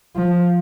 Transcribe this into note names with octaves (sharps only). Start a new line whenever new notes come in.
F3